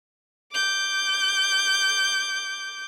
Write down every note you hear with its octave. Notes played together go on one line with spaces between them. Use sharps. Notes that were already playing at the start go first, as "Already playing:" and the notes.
D6 G6